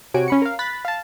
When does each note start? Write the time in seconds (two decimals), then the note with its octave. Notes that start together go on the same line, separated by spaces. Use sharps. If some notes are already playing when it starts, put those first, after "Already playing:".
0.14 C3 F#4 C#5 G#5 D7
0.28 C#4 B5 C#7
0.42 A#4 F5
0.59 B5 F#6 A6 B6
0.85 F5 A5